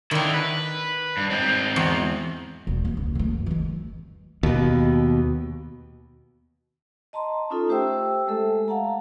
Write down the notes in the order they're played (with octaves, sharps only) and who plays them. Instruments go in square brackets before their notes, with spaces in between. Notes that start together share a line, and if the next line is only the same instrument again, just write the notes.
[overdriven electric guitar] D3 E4 [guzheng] D#3 D#4
[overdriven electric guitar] B4
G2
G#2 C4
[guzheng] E2
[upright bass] E1 G#3
E3 A#3
C#2 C#3
E3 A3
F#2
E3 G#3
[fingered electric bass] D#2 B2
[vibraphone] D#5 A5 A#5 C6
C#4 D#4 F4 A4
A3 G4 C5 E5 G5 E6
G#3 A3 A4 E5
F5 F#5 A5 A#5